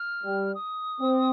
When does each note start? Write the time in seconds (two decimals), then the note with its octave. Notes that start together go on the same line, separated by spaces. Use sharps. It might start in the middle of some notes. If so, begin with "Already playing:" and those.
Already playing: F6
0.24 G3
0.55 D#6
1.01 C4